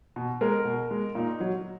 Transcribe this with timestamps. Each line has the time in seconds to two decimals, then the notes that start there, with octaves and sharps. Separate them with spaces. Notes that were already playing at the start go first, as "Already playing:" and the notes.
0.16 B2
0.41 G#3 A#4
0.65 B2
0.91 G#3
1.15 A#2 D#4
1.40 F#3